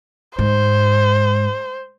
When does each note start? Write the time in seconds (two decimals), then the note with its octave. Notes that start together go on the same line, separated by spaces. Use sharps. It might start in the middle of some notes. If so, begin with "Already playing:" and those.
0.38 G#2 C5